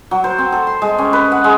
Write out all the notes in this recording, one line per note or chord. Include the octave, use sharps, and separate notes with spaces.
F#3
C5
C4
A4
C6
G#3
C#4
B4
F#5
G#3